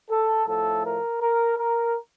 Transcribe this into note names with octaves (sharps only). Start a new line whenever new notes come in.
A4
A2 F3 A3 A4
A#4
A#4
A#4